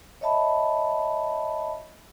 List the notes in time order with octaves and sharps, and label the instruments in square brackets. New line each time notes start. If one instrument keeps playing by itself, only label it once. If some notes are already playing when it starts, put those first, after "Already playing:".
[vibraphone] C#5 D#5 E5 A5 B5